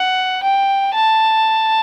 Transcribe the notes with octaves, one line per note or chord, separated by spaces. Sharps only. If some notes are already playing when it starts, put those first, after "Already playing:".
Already playing: F#5
G5
A5